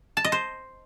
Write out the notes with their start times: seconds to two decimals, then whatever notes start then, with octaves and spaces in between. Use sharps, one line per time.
0.17 A5
0.24 D#5
0.32 C5